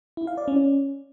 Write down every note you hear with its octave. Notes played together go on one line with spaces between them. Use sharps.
E4
F5
D5
C#4